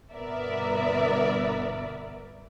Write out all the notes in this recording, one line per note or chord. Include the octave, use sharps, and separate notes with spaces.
G1 B2 B3 A#4 D5 E5